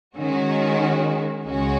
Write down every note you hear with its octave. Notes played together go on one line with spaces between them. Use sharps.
D#3 G#3 C#4 F#4
C#2 C#3 G#3 C#4 F#4